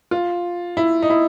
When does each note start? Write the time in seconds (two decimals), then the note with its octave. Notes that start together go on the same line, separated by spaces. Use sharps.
0.11 F4
0.77 E4
1.02 D#4
1.10 E4